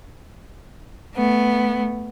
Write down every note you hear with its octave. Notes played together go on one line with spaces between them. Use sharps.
A3 B3